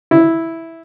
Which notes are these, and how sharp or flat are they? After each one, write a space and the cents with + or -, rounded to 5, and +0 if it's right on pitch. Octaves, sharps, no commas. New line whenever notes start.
E4 -5